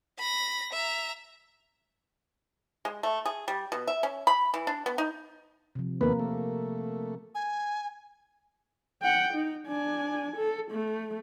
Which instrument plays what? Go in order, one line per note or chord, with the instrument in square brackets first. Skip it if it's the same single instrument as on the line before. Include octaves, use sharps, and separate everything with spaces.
[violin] B5 A#6
E5 A#5
[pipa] G#3
A3
G#4
G3
B2
E5
C#4
B5
E3
D4
B3
D#4
[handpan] C3 F3
[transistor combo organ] D#2 B3 B4 [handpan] A#3 A#4
[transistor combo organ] A3
[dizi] G#5
[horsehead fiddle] F#5 G5
D#4
D4 G#5
A4
A3